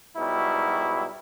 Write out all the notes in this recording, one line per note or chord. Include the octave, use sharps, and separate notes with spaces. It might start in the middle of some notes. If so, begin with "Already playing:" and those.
G#2 B2 F#3 G3 E4